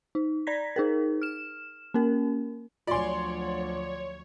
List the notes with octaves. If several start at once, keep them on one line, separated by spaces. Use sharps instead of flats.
D#4
D5 A#5 G#6 A#6 B6
D#4 G#4 A#4
F6 E7
A#3 C#4 A#4
D2 F3 F#3 F4 C#5 D5 G#5 C6